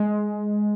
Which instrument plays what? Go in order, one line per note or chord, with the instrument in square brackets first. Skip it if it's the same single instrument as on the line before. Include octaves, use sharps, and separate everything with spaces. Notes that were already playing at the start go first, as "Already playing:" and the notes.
Already playing: [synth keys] G#3